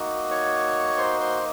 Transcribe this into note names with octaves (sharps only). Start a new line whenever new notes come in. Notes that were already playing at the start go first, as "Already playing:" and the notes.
Already playing: A#3 D#4 F#4
C#5 C#6
C5 C6
C5 C6